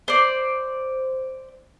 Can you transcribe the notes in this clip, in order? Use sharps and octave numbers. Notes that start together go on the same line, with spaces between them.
C5 D5